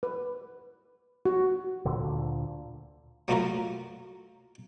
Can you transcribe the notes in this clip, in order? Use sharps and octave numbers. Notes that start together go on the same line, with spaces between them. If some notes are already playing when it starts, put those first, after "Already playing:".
B4
F#4
D2 A#2 D3
F#3 A3 A#3 F4 F#4 A#4